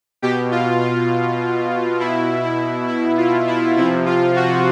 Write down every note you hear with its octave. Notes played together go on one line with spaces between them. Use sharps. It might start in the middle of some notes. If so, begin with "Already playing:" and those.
B2 G4
F4
F4
B2 E4
E4
E4
F4
E4
C3 F3 E4
F4
F#4